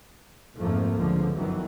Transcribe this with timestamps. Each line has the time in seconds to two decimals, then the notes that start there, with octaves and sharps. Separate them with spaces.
0.58 F2 G#2 F3 A3 A#3
0.96 C#2 D3 F3
1.35 G1 F#2 D#3 E3 F#3